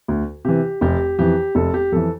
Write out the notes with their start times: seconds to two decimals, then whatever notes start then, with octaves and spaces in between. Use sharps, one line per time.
0.08 D2
0.45 C3 E3 G4
0.81 F1 G4
1.19 F2 E3 G4
1.55 F1 A4
1.74 G4
1.92 F2 E3 A4